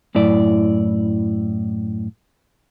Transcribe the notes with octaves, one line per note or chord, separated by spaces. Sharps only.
F#2 A2 E4 D5